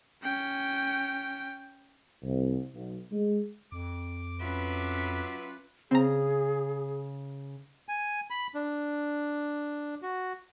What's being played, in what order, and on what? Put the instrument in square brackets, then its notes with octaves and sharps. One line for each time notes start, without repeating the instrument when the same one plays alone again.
[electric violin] C#4 G5
[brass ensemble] C2
B1
G#3
[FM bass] F2 [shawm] D6
[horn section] F#3 F4 B4 [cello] C#4 E5
[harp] C#3 [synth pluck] C4 A#5 [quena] G#4
[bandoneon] G#5
B5
D4
F#4